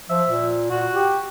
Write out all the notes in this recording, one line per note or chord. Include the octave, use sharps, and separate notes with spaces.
F3 E5
A#2
A#2 F#4
G4